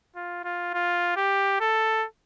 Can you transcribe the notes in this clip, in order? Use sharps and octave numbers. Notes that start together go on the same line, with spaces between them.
F4
F4
F4
G4
A4